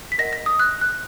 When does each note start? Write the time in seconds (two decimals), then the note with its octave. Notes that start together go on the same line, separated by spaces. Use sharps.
0.12 B6
0.18 A#4 D#5 F#5 A#6
0.33 A#6
0.46 D#6
0.59 F#6
0.81 F#6